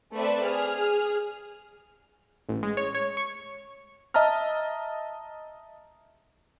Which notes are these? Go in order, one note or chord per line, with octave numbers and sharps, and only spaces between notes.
A3 C4 A4 B4 D5 E5
G#4 F6
A1
G#3
C#5
C#5
C#6
D#5 E5 A5 A#5 F6